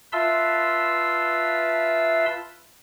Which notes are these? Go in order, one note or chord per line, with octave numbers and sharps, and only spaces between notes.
F4 B4 E5 A5 C6 E6